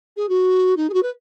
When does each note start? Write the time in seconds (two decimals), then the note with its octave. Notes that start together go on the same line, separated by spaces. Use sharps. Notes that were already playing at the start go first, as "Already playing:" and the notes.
0.17 G#4
0.29 F#4
0.77 D#4
0.90 G#4
0.93 F#4
1.03 B4